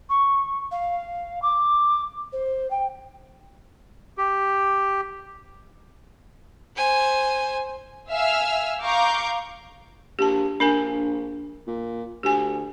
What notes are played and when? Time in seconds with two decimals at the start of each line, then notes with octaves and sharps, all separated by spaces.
0.10 C#6
0.72 F5
1.42 D6
2.33 C5
2.71 G5
4.18 G4
6.76 C5 G#5
8.12 E5 F5 G#5 E6 F6
8.82 F5 A#5 C#6 D6 G6
10.19 A#1 G4 A5
10.60 A#1 D4 A#4 G#5
11.67 A#2
12.23 D2 G4 G#5